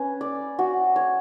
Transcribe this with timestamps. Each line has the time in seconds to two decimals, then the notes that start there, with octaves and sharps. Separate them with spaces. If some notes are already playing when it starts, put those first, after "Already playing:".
Already playing: C#4 B4
0.21 D5
0.59 F#4
0.96 C#5